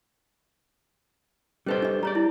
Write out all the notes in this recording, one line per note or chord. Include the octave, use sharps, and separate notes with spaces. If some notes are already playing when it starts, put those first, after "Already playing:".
G3 C#4 A4 B4 C5 D#5
D4 D#5
G3 G#4 C#5 D5 A#5
E4